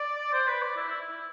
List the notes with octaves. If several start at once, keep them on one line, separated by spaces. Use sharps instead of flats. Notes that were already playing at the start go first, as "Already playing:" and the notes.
Already playing: D5
C5
B4
D5
E4
E4
E4